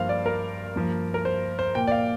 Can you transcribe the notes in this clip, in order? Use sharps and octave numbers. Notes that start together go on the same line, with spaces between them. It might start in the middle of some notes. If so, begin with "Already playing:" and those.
Already playing: G2 F3 A#3 C5 F5
D5
A#4
G2 F3 A#3
A#4
C5
C5
A#2 A#3 G5
D5
F5